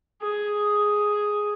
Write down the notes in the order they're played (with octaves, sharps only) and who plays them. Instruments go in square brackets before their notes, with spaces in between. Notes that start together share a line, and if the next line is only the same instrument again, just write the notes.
[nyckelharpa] G#4